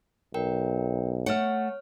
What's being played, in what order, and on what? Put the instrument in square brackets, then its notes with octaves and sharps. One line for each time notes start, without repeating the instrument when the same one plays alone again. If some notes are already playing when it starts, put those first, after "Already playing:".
[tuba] B1 [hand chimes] A#4 G5
[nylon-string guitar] A3 F#5 [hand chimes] C#5 F6